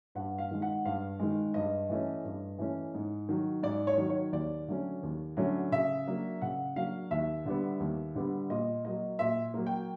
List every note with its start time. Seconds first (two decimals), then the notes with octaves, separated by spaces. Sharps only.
0.15 G2 F#5
0.38 F5
0.51 D#3 G#3
0.62 F#5
0.85 G2 F5
1.19 D#3 G#3
1.54 G2 D#5
1.89 E3 A3 C#4
2.24 G2
2.58 E3 A3 C#4
2.94 G#2
3.29 D#3 F#3
3.63 G#2 D5
3.87 C#5
3.98 D#3 F#3
4.09 C#5
4.33 D#2 D5
4.68 D3 F#3 A3 C#4
5.03 D#2
5.37 D3 F#3 A3 C#4
5.72 C#3 E5
6.07 F#3 A#3 D4
6.42 C#3 F#5
6.76 F#3 A#3 D4 F5
7.11 D#2 E5
7.45 D3 G3 B3
7.80 D#2
8.15 D3 G3 B3
8.50 A#2 D#5
8.85 F#3 A#3 D#5
9.19 A#2 E5
9.54 F#3 A#3
9.67 G5